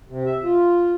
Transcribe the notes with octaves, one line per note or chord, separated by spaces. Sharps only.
C3
E5
F4